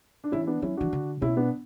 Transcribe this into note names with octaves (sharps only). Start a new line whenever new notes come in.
D4
E3 C#4 E4
E4
B3 D4
F#3 C#4 E4
E3 D4 F#4
D3
B2 C#4 E4
B3 D4